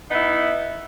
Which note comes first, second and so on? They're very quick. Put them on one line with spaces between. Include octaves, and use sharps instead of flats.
D#4 B3 E4